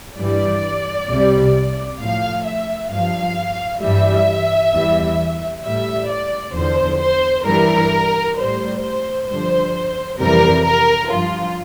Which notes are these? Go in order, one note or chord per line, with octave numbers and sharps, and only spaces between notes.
G2 E3 G3 D5
C2 C3 G3
A2 F3 F5
E5
G2 F3 F5
G2 E3 G3 E5
E2 E3 G3
A2 G3 E5
D5
E2 D3 F3 C5
C5
G2 E3 G3 A#4
A2 G3 C5
C5
G2 D3 F3 C5
F2 C3 E3 G3 A#4
A#4
G2 F3 F4